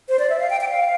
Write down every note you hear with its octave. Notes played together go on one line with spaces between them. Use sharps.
C5
D5
E5
F5
G5
G5
F5